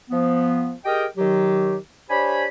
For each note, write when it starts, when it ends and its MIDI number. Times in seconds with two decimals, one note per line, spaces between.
0.11 0.72 53
0.11 0.72 59
0.85 1.05 67
0.85 1.05 68
0.85 1.05 70
0.85 1.05 75
0.85 1.05 79
1.18 1.76 51
1.18 1.76 54
1.18 1.76 67
2.10 2.46 62
2.10 2.46 67
2.10 2.46 72
2.10 2.46 73
2.10 2.46 80
2.10 2.46 83